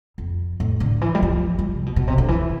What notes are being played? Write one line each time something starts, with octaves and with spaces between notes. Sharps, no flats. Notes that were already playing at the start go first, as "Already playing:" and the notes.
F2
A2
D3
E3
G3
F3
G3
C3
B2
B2
C3
D3
E3